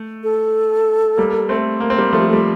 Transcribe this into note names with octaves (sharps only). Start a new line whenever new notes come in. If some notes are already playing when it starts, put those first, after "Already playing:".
Already playing: A3
A4
G3 A#3
A3 C4
A#3
C4
G3 A#3
F3 A3 A4
G4
G3 A4